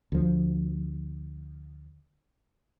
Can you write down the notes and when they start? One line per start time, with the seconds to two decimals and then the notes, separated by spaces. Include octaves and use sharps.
0.12 D2 F3